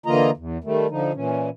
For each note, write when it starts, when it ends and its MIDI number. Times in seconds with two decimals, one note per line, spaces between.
0.06 0.30 50
0.06 0.30 52
0.06 0.30 58
0.06 0.30 65
0.06 0.30 75
0.06 0.30 82
0.37 0.58 40
0.64 0.87 51
0.64 0.87 55
0.64 0.87 57
0.90 1.12 50
0.90 1.12 53
0.90 1.12 63
1.14 1.49 46
1.14 1.49 52
1.14 1.49 61